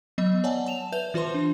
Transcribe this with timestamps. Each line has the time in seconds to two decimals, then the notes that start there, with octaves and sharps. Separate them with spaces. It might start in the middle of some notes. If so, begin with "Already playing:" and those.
0.18 F#3 B3 D#5
0.44 C#5 D5 F#5 G#5 A5
0.66 A5 E7 F7
0.92 B4 E5 G6 F7
1.14 E3 F4 B4 C5 C6
1.34 D4